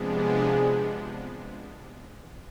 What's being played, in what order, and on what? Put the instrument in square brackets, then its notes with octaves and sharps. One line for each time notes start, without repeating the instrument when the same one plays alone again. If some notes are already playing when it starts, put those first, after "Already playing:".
Already playing: [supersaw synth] C3 F3 G#3 B3 D4 [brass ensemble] G#4